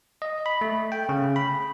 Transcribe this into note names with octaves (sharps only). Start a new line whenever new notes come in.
D#5
B5
A3
G5
C#3
B5